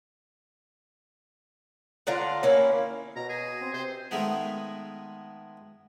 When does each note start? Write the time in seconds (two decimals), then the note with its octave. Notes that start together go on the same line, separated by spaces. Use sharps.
2.07 D3 D4 F4 A#5
2.43 A#3 C#4 E4 F5
3.16 B2 A#5
3.29 G#4
3.61 C4
3.73 C3 C5
4.11 D#3 G#3 A3 B3